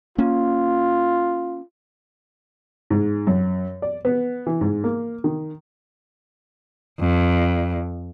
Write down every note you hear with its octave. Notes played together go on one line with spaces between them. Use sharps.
A#3 C#4 F4
G#2
F#2
D5
B3
E3
G#2
A#3
D#3
F2